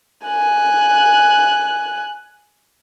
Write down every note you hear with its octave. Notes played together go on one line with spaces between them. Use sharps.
G#5 F#6